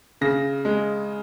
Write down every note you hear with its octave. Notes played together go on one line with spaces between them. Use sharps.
C#3 A#6
G#3